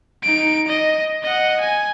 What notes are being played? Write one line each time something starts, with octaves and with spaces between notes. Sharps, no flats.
D#4 D7
D#5
D#5 F#5
G#5